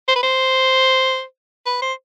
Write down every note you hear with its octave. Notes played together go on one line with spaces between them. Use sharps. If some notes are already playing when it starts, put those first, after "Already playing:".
C5
B4
C5
B4
C5